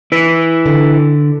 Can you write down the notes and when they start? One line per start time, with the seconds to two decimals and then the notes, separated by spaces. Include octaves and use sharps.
0.12 E4 B4
0.66 D3